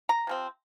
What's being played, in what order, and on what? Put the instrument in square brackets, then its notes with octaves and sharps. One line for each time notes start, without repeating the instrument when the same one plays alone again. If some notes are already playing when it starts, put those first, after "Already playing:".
[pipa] A#5
C3 F3 C4